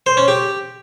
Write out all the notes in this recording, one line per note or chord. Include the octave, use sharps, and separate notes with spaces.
C5
C#4
G4